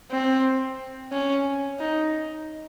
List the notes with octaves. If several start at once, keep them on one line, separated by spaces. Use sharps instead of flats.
C4
C#4
D#4